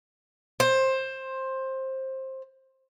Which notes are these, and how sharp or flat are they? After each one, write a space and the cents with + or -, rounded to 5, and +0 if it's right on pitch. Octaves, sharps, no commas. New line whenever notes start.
C5 +15